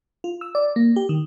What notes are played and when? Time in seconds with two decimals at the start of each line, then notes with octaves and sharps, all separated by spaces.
0.24 F4
0.41 E6
0.55 D5
0.76 A#3
0.96 G4
1.09 D#3